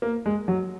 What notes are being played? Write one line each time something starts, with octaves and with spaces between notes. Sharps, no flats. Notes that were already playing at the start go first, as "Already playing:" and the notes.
A#3
G#3
F#3